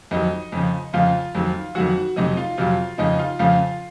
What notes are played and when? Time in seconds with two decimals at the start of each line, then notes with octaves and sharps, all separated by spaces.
0.11 F2 D#3 F#3 D#4 D#5
0.52 F2 C#3 F3
0.93 F2 C#3 F3 F4 F5
1.35 F2 D#3 F#3
1.75 F2 D#3 F#3 F#4 F#5
2.16 F2 C3 F#3 D#4 D#5
2.37 F4 F5
2.58 F2 C3 F#3 F4 F5
2.98 F2 C#3 F3 D#4 D#5
3.19 F4 F5
3.39 F2 C#3 F3 F4 F5